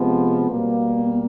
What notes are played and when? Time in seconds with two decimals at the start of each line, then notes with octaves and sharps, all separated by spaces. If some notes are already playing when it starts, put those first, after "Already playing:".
Already playing: C3 F3 G#3 B3
0.47 B2 G3 A#3